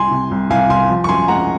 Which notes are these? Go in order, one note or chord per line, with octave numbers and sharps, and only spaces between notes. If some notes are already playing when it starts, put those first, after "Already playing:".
Already playing: C2 G#5 C6
C3
C2
C2 F5 G#5
C2 G#5 C6
F3
C#6
F#2 G#5 C6
G#3 F#5 A#5